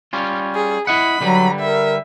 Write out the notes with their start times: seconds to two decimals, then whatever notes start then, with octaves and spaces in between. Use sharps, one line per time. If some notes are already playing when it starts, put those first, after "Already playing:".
0.13 G3 C#4 F4
0.55 G#4
0.87 E4 D#5 F#5 B5
1.21 D3 F#3 G3 B4
1.59 A#4 E5